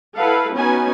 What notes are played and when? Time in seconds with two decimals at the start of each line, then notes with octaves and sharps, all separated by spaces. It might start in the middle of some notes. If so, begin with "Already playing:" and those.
0.15 E4 A4 B4 F5 F#5
0.53 B3 C#4 D#4 F#4 B4 G#5